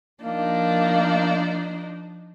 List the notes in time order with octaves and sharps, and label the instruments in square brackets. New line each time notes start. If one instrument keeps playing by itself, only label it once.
[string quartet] F3 D4 D#4 [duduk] A#3